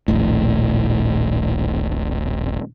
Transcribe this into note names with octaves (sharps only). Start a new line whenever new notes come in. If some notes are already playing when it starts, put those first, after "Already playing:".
D#1 A#1 A2